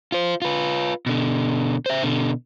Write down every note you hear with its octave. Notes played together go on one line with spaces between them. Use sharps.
F4 C5
F4 B4
B2 D3
C5 E5
B2 D3